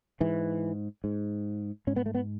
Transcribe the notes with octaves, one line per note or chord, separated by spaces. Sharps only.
G#2 E3
G#2
G#2 C#4
B3
A3
B3